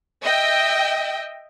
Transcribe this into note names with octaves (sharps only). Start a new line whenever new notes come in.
D#5 E5 G5